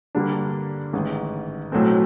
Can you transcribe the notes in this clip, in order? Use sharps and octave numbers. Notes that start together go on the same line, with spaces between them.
G2 D3 G3 A#3 D4
A1 G#2 D#3
B1 A2 F#3 A3 C4